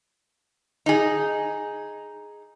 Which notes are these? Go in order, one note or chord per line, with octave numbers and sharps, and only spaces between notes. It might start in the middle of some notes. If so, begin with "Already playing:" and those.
D#4 G#4